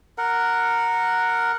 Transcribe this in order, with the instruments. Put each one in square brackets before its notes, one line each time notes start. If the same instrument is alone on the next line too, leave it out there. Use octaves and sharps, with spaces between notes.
[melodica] A#4 F#5